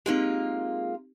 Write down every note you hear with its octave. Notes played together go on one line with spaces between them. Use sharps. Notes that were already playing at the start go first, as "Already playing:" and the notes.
G#3 A#3 C4 D#4 F4 G4